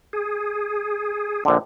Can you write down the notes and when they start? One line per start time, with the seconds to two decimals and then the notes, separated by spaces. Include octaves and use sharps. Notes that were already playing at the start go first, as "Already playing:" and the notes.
0.13 G#4
1.45 A#1 D3